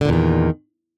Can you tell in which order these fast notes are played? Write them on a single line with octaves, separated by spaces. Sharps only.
D3 A#2 E2 D#3